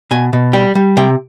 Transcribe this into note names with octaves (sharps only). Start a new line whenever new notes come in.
B2 G#5
B2
G3 G5
G3
C3 G5